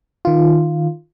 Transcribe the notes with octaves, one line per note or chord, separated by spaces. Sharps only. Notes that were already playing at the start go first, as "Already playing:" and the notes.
D#3 F4